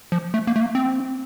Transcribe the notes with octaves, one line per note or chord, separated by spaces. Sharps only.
F3
A3
A#3
A3
A#3
C4